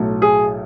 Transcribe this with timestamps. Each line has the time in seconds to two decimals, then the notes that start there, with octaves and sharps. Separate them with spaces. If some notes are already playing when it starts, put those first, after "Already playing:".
Already playing: B1 A2 F#3 A3
0.22 G#4